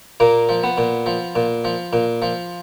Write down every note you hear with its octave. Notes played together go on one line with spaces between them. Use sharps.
A#2 A#3
F3
B3
A#2
F3
A#2
F3
A#2
F3